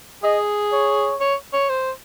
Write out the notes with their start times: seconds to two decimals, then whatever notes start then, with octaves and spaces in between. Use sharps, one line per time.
0.23 G#4 D#5
0.73 C#5
1.20 C#5
1.53 C#5
1.69 C5